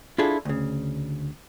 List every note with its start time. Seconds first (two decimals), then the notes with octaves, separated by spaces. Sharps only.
0.18 D4 E4 F4 G#4 A4
0.45 D2 C#3